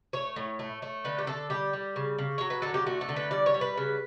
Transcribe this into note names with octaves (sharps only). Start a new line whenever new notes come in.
A3 C#5
A2
A3
A3
D3 B4
G4
D3 A4
G3 G4
G3
C#3
C#3
F#3 C#5
B4
D3 A4
G4
A3 F#4
A4
D3
B4
G3 D5
C#5
G3
B4
C#3